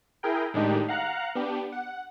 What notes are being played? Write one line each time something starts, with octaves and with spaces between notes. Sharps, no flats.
E4 G#4 A#4 G5
A2 D#3 G#3 D4 D#4 G4
F5 F#5 A#5 F#6
B3 D4 G4
F#5